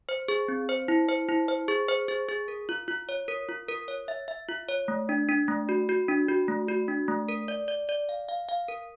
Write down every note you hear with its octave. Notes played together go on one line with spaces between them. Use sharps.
C5
G#4
C4
C5
E4
C5
E4
C5
G#4
C5
G#4
G#4
A#4
F4
F4
C#5
A#4
F4
A#4
C#5
E5
E5
F4
C#5
A3
D4
D4
A3
F#4
F#4
D4
F#4
A3
F#4
D4
A3
A#4
D5
D5
D5
F5
F5
F5
A#4